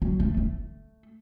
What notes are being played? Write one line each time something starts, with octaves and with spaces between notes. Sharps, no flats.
F#3
A3
A3